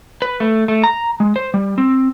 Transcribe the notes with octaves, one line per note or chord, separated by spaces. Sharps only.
B4
A3
A3
A#5
G#3
C5
G3
C4